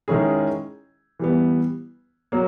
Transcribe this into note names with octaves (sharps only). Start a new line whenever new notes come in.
D#3 G#3 C#4 E4 G#4
E3 G3 B3
F#3 A#3